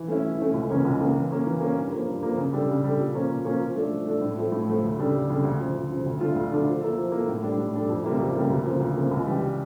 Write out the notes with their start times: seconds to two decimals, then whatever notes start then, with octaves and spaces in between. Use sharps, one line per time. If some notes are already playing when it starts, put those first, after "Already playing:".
Already playing: E3
0.08 A3 C#4 E4
0.24 E3
0.38 A3 C#4 E4
0.54 C#2
0.69 C#3 E3 A#3 C#4
0.85 C#2
1.00 C#3 E3 A#3 C#4
1.16 E3
1.31 A#3 C#4
1.46 E3
1.61 A#3 C#4
1.77 G2
1.92 F3 A#3
2.08 G2
2.23 F3 A#3
2.37 C#3
2.53 G3 D4 A4
2.68 C#3
2.84 G3 D4 A4
2.98 A#2
3.14 F3 A#3 C#4
3.29 A#2
3.45 F3 A#3 C#4
3.61 F3
3.76 A3 D4 A4
3.91 F3
4.06 A3 D4 A4
4.21 A2
4.37 F3 A3
4.52 A2
4.68 F3 A3
4.83 D2
4.98 C#3 G3 D4 A4
5.13 D2
5.29 C#3 G3 D4 A4
5.43 D2
5.60 C#3 F3
5.75 D2
5.90 C#3 F3
6.06 D2
6.21 D3 A3 D4 F4
6.35 D2
6.52 D3 A3 D4 F4
6.66 F3
6.81 A#3 E4 A4
6.97 F3
7.12 A#3 E4 A4
7.28 A2
7.43 G3 D4 A4
7.58 A2
7.73 G3 D4 A4
7.89 F2
8.04 C#3 G3 A#3 E4
8.19 F2
8.35 C#3 G3 A#3 E4
8.50 D2
8.66 C#3 F3 A#3
8.80 D2
8.97 C#3 F3 A#3
9.11 C#2
9.26 C#3 E3 G3